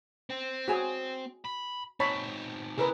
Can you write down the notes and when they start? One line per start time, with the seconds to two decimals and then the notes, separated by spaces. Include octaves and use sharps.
0.30 C4
0.68 F#4 G#4 G#5
1.45 B5
2.00 C4 D#4 C#5 A5 B5
2.78 C#3 E4 G#4 A#4 B4